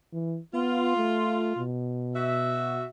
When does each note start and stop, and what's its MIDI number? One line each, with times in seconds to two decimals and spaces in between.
0.13 0.39 52
0.54 0.92 59
0.54 1.62 65
0.97 1.55 57
1.57 2.85 47
2.15 2.85 66
2.15 2.85 76